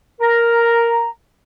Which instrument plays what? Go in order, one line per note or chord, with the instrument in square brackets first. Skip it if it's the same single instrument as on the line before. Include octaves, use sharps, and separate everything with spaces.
[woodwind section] A#4 A#5